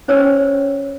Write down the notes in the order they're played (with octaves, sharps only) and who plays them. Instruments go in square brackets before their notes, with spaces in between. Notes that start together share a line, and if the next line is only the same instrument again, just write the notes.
[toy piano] C#4 C5 C#5 E6